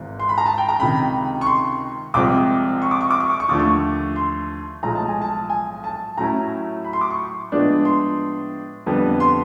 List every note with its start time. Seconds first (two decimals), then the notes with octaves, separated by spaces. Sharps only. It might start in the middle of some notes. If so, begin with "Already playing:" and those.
Already playing: G#1 G#2 E3
0.19 C6
0.29 B5
0.38 A#5
0.46 A5
0.58 G5
0.68 A#5
0.80 C#2 C3 D#3 B5
1.41 C#6
1.46 C6
2.14 C2 C3 F3 G#3 C4 D6
2.82 C#6
2.91 D6
3.01 C#6
3.11 D6
3.20 C#6
3.30 D6
3.40 C#6
3.48 D#2 D3 F3 A3 D6
3.60 C#6
4.16 C6
4.83 B1 A2 F3 G#3 A#5
4.95 A5
5.08 G#5
5.22 A5
5.50 G#5
5.84 A5
6.17 A2 F#3 A3 C#4 E4 A#5
6.84 B5
6.93 C6
7.01 D6
7.10 C#6
7.52 A2 F3 G#3 B3 D4
7.85 C6
8.86 F2 D3 G3 B3
9.20 C6